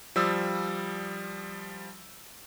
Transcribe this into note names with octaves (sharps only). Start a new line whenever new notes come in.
F3 G3 D#6 E6